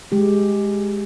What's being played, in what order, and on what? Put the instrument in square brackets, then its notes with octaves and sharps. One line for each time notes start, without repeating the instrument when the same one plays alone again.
[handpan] G#3 G4